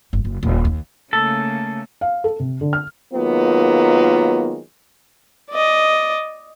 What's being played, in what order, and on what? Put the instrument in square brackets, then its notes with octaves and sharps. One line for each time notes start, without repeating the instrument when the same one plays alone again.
[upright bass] G1
F#1
D#1
D#2
[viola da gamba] C#3 A3 A#3 [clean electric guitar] A4
[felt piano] F5
A4
C3
D3
F6
[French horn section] D#3 F#3 G#3 A#3 B3 F4
[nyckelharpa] D5 D#5